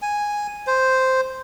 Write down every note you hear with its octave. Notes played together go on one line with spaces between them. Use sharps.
G#5
C5